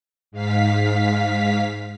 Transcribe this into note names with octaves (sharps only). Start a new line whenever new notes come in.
G#2 F5 B6